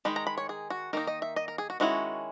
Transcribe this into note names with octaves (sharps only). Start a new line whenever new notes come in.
D#3 G#3 D#4 B5
A#5
B5
C#5
G#4
F#4
D#3 A#3 D#4 A#4
D#5
E5
D#5
A#4
G#4
F#4
D#3 G#3 C#4 E4 F#4